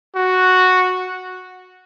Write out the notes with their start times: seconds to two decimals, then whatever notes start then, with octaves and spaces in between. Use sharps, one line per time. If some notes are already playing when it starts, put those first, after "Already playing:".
0.16 F#4